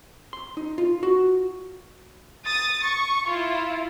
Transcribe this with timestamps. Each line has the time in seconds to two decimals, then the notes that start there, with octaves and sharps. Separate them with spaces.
0.33 C6
0.57 D#4
0.78 F4
1.03 F#4
2.48 D#6 A6
2.84 C#6
3.28 E4 F4